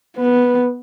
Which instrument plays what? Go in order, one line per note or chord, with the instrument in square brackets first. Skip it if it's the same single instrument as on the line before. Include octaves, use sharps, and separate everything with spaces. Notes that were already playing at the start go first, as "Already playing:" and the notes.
[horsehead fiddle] B3 [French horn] B4